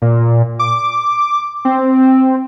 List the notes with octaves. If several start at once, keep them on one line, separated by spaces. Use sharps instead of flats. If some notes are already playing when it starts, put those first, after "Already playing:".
A#2
D6
C4